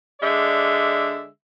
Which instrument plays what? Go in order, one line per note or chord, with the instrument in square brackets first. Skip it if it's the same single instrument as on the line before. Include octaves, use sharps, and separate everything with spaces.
[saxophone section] D3 G#3 D5 E5